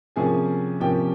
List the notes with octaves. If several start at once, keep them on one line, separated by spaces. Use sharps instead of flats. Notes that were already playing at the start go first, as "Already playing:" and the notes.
C3 F3 A#3 C#4 G#4 G#5
C3 F3 A#3 C#4 G4 G5